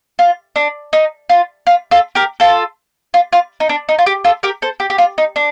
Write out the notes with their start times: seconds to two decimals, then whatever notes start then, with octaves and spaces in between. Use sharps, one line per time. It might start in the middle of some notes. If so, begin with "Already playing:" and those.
0.19 F4
0.56 D4
0.93 D#4
1.29 F4
1.67 F4
1.91 F4 A4
2.15 G4 A#4
2.40 F4 A4
3.14 F4
3.33 F4
3.60 D#4
3.69 D4
3.89 D#4
3.99 F4
4.06 G4
4.24 F4 A4
4.43 G4 A#4
4.62 A4 C5
4.80 G4
4.90 G4
4.98 F4
5.18 D#4
5.36 D4